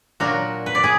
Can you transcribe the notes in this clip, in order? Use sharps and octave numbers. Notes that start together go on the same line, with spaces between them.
A#2 F#3 D4 F#4 A#4
B4
D5
G#4